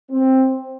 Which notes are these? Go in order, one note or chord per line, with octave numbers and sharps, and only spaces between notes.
C4